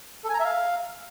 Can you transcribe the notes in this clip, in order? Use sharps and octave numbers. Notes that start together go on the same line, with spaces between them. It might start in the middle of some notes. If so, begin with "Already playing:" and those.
A4
G#5
A#5
E5
F5